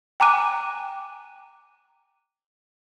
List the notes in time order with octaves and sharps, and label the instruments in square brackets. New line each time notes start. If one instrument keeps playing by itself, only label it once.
[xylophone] G5 G#5 A#5 D6 F#6 D#7